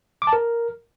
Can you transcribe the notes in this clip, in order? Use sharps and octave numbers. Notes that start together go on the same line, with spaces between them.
D6
A5
A#4